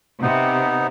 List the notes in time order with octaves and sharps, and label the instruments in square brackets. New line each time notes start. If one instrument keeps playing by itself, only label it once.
[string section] C3 [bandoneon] B3 D#4